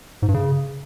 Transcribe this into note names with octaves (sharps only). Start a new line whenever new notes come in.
G#2
G2
C#3